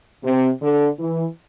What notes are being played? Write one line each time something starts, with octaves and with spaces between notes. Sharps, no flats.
C3
D3
E3